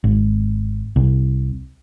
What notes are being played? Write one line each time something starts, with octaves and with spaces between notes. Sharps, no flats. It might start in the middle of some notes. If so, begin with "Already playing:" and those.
G#1
C2